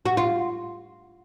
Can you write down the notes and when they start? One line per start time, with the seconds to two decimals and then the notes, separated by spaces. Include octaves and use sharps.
0.05 F#4
0.17 F4